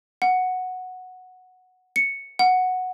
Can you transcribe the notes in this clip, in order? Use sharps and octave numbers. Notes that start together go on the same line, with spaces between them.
F#5
C#7
F#5